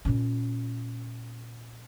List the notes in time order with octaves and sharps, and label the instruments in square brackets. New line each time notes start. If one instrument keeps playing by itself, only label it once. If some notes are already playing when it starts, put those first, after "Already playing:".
[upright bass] A#2 C#4